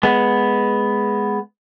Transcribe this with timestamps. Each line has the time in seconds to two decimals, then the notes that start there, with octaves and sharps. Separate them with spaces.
0.03 G#3 B3